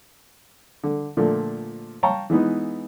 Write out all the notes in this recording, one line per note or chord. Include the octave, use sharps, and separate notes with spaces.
D3
A#2 D3 F3 A3
C#5 F5 G5 A5 A#5 C#6
E3 G#3 B3 D#4